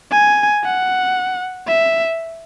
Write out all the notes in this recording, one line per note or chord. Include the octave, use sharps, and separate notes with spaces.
G#5
F#5
E5